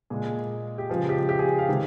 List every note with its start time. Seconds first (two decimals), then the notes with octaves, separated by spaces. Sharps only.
0.10 A#2 G#3 G#4
0.78 G4
0.89 C#3 F3 G#3 G#4
1.09 G4
1.29 G4
1.39 G#4
1.59 F5
1.69 C3 D#3 G#3